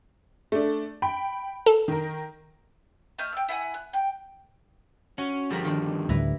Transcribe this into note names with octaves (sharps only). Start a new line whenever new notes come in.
A3 D4
G5 B5
A4
D#3 A#4
A3 D#5 F6 G6
G5 E6
E4 F#5 G#5
F#6
G5
C#4 F#4
G2 D3 F3 G3 A#4 B5
D#3 D4
D2 A2 G3 E4 B4 A#5